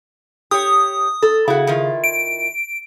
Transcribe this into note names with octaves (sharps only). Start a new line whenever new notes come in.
G4 C#5 D#6
A4
C#3 E4 F#4
D#3 E4 F4
D7